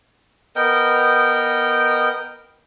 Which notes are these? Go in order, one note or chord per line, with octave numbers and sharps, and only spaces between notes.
B3 A#4 D#5 G5